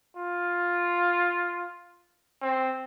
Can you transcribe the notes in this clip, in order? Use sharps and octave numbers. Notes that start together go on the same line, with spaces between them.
F4
C4